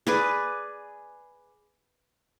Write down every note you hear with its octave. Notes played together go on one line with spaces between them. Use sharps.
G#4 B4 D5